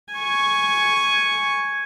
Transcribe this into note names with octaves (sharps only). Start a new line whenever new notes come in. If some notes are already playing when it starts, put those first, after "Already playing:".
G#5 C#6